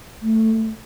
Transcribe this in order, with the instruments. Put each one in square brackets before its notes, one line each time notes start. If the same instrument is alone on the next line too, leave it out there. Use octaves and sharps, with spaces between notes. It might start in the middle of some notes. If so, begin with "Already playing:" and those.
[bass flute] A3